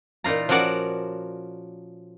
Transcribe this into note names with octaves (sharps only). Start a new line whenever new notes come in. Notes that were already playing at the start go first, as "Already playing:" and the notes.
A#2 E3 D#4 F4 A#5
F3 C#4 F#4 A#4 D5 F#5